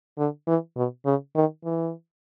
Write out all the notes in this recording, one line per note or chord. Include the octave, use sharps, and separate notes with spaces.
D3
E3
B2
C#3
D#3
E3